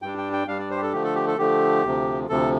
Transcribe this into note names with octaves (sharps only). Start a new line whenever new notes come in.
G2 G3 D4 G5
G5
G5
G2 G3 D4 F5
D5
C5
G4
A4
D3 F3 A3 G4
A4
G4
A4
D3 F3 A3 G4
D2 C3 F3
D2 C3 F3 A4